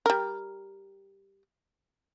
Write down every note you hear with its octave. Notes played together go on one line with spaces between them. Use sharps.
G3 A#4